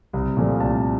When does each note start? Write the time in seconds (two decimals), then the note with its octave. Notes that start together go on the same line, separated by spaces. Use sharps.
0.13 C2
0.37 A#2 F3 A3
0.60 C2 A5